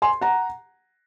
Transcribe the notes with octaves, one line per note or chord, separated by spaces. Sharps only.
G#5 C6
F#5 A#5